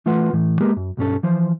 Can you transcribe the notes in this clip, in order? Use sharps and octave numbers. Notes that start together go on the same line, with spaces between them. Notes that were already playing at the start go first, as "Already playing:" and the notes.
E3 A3 F4 B4 F#5 C6
A2 E3
G#3 A#3 B3 G4 G#4 A#4
F#2
B1 G2 C#4 A4
E3 F3 C5